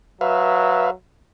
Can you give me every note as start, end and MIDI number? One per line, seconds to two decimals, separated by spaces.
0.21 0.92 54
0.21 0.90 71
0.21 0.90 76
0.21 0.90 77